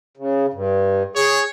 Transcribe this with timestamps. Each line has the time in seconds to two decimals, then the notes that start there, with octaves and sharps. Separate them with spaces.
0.17 C#3
0.54 G2
1.16 G#4 C#5